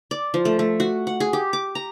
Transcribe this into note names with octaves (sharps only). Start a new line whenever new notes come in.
D5
F3
A3
A3
F#4
F#5
G#4
G4
D6
A#5